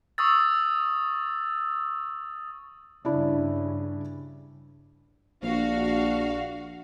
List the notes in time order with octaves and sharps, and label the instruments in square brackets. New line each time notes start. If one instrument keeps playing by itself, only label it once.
[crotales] C#6 D#6 E6 A6
[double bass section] G2 C#3 [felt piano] D4 E4
[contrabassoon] A#1 [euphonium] D4 [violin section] F#4 F5